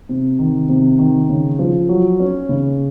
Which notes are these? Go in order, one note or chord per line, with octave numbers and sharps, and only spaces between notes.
C3
D#3
C3
D#3
C#3
F3
F#3
C#4
C#3